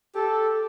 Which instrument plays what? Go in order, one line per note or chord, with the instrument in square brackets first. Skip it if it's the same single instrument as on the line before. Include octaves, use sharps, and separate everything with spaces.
[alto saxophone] G4 [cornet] A4